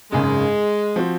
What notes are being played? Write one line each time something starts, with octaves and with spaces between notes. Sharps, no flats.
G#1 F#2 C#3 G#3
F3 C4 F#4